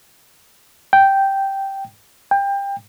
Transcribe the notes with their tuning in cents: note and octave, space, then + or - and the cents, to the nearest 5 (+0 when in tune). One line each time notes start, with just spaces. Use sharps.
G5 -5
G5 +25